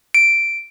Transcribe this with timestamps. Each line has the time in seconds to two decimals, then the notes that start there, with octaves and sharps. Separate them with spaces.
0.14 D7